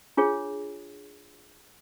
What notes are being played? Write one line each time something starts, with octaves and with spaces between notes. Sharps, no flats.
D4 F4 G#4 C#5